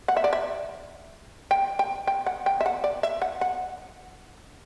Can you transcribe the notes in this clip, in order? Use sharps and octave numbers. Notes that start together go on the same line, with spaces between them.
F#5
E5
D5
E5
G5
G5
G5
F#5
G5
E5
F#5
D5
E5
F#5
F#5